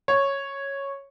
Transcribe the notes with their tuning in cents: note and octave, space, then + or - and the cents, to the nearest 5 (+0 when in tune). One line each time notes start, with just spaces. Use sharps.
C#5 -5